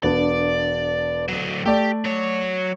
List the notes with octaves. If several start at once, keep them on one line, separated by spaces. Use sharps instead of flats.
E1 B3 D4 D5
D3 F#3
A3 G4 D5
F#3 C#5